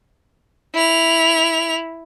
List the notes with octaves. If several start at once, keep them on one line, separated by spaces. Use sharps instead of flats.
E4 F7